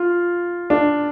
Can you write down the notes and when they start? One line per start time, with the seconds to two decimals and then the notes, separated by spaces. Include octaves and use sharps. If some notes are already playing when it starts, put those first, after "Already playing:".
Already playing: F4
0.70 D4